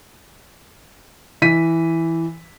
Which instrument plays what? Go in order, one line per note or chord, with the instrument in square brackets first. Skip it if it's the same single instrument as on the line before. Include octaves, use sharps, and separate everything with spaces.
[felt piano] E3 B6 D#7